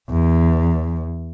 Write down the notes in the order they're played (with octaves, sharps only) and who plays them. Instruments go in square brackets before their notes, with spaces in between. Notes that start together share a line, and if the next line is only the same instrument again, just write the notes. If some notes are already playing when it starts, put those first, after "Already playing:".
[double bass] E2